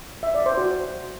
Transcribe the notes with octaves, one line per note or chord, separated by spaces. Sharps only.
E5
D5
C5
F#4